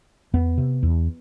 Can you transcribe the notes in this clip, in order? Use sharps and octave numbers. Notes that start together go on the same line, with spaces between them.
E2 B3
C3
E2